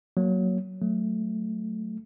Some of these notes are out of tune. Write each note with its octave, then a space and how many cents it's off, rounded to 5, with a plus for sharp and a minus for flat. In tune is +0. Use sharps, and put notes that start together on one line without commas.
F#3 +5 A#3 +0
F#3 +0 A3 +0